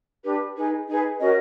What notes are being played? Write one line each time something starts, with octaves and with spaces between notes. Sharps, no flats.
D4 G4 B4
D#4 G#4 B4
D#4 G#4 B4
C#4 F#4 A#4 D#5